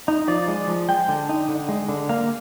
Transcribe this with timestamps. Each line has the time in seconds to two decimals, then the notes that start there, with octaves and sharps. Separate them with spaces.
0.08 D#4
0.28 F3 D5
0.48 G#3
0.68 F3
0.89 G#3 G5
1.09 D3
1.29 D#4
1.49 D3
1.69 G#3
1.89 D3
2.09 A#3 F5